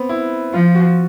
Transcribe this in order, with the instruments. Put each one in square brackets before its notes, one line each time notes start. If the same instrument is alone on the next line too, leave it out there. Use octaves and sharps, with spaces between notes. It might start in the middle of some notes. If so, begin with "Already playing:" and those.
Already playing: [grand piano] B3 C4
E4
[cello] F3 [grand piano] F4
[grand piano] F#4